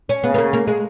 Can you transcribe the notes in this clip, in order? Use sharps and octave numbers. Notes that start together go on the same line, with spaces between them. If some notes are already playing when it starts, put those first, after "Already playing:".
C#4
C#3 B3
B3
A#3
A#3
G#3